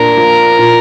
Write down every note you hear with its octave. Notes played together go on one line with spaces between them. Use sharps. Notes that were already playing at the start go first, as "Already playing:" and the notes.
Already playing: A#2 D4 A#4
F3
A#2